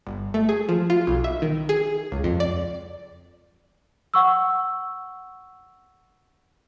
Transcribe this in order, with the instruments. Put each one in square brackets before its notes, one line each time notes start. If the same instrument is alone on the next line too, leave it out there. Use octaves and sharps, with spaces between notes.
[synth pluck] G1
A3
G#4
F3
F4
B1
E5
D#3
G#4
C#2
F2
D5
[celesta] F#5 C#6 E6